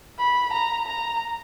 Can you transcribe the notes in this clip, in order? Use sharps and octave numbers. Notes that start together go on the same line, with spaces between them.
B5
A#5
A#5